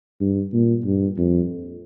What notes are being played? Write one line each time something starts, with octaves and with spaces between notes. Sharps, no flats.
G2
A#2
G2
F2